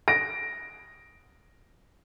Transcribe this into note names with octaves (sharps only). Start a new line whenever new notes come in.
A#6 D7